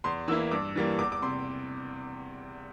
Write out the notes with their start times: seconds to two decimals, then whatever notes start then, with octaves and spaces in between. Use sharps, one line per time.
0.04 E2 C6
0.28 E3 A#3 E4 E6
0.51 G2 D6
0.76 E3 G3 A#3
0.99 E2 D6
1.12 D6
1.22 C3 C6